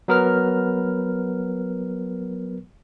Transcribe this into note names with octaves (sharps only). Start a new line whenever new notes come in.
F#3 B3 A#4 B4 F6